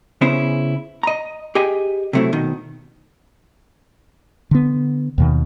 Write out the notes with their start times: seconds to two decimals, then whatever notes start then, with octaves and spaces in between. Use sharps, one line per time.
0.21 C#3 B3 C#4 E4 G#4 C5
1.03 D#5 A#5
1.55 G4 G#4 D#5 G5 G#5
2.13 C3 F#3 A3 C4 E4
2.33 B2 D#3
4.51 D3 B3
5.18 D#2 B2 D#3